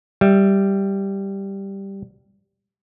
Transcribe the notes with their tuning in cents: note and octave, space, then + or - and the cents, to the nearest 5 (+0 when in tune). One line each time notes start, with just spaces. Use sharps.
G3 +0 E5 +0